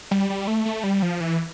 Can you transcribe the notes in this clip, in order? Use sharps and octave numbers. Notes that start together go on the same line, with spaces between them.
G3
G3
A3
A3
G3
F3
E3